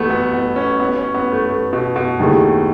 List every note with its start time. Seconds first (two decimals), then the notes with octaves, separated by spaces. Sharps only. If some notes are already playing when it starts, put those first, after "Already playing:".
Already playing: A1 A2 F#3 A3 B3
0.10 B3
0.33 B3
0.56 C#4
0.80 B3
0.97 C#4
1.14 B3
1.32 A3
1.49 A3
1.73 B2
1.96 B2
2.19 D#2 D#3 A3 E4 G#4